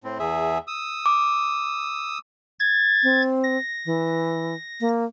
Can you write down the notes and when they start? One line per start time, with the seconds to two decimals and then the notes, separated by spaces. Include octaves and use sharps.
0.04 A2 C4
0.19 E2 G#4 E5
0.67 D#6 E6
1.06 D6
2.59 G#6 A6
3.03 C4
3.43 A#6
3.86 E3
4.81 A#3